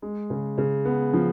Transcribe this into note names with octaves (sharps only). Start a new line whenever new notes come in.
G#3
C#3
C#3
B3
F3